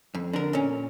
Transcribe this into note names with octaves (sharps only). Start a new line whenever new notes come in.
F2
D3 A#4
A#2 C#4